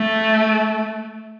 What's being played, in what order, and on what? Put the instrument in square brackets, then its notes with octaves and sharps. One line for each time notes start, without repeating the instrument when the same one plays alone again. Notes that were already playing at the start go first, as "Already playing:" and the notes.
Already playing: [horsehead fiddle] A3